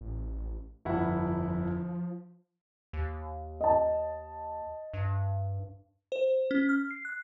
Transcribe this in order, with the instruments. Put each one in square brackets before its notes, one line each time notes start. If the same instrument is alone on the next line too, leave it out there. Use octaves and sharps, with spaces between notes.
[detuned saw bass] A1
[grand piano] G1 E4 F#5 [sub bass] F2 [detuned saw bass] F3
[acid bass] D#2
[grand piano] D#5 A5
[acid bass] G2
[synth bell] C5
C#4
F6
C7
F#6